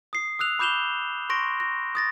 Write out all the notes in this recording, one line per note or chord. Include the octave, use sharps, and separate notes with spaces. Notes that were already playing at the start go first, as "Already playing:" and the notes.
D#6 C7
D#6 E6 F#6 F7
B5 D6 G6 E7 F7 G7
C6 C#6 A#6 D7
A#6
D#6 A6 A#6